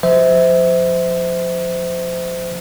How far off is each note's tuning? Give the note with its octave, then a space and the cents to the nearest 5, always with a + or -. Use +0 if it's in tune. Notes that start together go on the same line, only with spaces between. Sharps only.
F3 +40 C5 -25 E5 -25